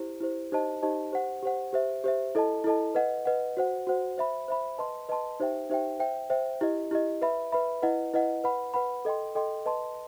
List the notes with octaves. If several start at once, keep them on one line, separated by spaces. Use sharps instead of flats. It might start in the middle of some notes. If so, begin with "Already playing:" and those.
Already playing: E4 G4 C5
E4 G4 C5
D#4 G4 C5 D#5 A5
D#4 G4 C5 D#5 A5
G4 C5 F#5
G4 C5 F#5
G4 C5 E5
G4 C5 E5
E4 A4 D#5 A5
E4 A4 D#5 A5
B4 D#5 F#5
B4 D#5 F#5
F#4 C5 F#5
F#4 C5 F#5
C5 E5 B5
C5 E5 B5
B4 D#5 A5 C6
B4 D#5 A5 C6
D#4 G4 C5 E5 G5
D#4 G4 C5 E5 G5
C5 E5 G5
C5 E5 G5
E4 G4 D#5
E4 G4 D#5
B4 E5 B5
B4 E5 B5
E4 B4 D#5 F#5
E4 B4 D#5 F#5
B4 F#5 B5
B4 F#5 B5
A4 D#5 G5 C6
A4 D#5 G5 C6
B4 D#5 A5 C6